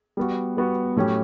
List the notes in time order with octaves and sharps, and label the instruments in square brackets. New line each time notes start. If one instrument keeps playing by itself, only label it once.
[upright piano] G3 B3 F#4
G3 B3 F#4
A2 F#3 A3 C#4 G4